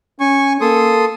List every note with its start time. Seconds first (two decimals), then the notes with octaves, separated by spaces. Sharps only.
0.20 C#4 G#5 C#6
0.61 A#3 A4 C6 D#6